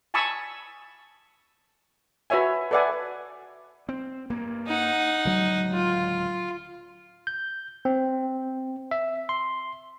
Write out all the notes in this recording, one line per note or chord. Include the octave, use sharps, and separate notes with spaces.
G#5 A5 B5 C#6 D#6 E6
F#4 B4 C#5 E5 G#5
A4 B4 D5 E5 F#5 G#5
C4
G2 A#3
D#4 F#5
D1 C#2 F#3
F4
G6
C4
E5
C6